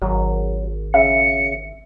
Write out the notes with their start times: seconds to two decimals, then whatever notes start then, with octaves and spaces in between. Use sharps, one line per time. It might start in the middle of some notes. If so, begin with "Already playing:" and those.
0.02 G#1 F#3
0.94 C#3 E5 C#7